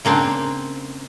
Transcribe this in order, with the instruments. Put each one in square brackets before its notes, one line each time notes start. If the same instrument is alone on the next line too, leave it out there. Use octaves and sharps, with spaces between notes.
[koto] C#3 A#3 C4 D4